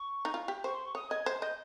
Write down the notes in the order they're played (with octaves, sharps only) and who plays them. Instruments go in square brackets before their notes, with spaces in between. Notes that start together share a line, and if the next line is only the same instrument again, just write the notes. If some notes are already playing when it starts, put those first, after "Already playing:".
Already playing: [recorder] C#6
[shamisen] D#4
F4
G4
[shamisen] C5 [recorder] C#6
[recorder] C6
C#6
[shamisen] C#5 [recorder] D#6
[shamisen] D#5 [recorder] G#6
[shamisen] C5
[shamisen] D#5 [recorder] G6